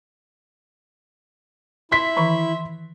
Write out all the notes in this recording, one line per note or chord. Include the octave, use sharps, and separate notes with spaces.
E4 E5 C6 B6
D#3 E3 B5